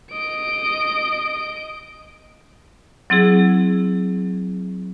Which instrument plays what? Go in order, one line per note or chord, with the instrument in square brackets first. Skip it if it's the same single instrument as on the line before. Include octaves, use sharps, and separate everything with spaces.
[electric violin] D#5 D7
[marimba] F#3 C4 E4 G#4